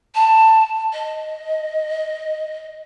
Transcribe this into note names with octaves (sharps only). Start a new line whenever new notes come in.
A5
D#5